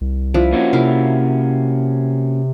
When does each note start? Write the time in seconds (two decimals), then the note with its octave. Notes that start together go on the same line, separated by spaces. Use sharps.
0.01 C2
0.34 F3 D4 E4
0.53 A#3 C#4 F#4
0.73 C3 E4 A#4 F5